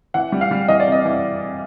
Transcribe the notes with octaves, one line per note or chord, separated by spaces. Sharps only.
E3 F#5
G3
F5
G3
E3 D#5
D5
C3
D#5
E3